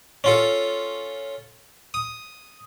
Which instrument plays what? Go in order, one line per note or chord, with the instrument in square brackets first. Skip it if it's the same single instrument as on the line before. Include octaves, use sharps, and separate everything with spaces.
[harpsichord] C#4 F4 A4
D#6